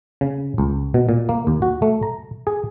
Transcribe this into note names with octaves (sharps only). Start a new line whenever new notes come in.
C#3
C#2
B2
A#2
A#3
D#2
F#4
A3
A#5
G#4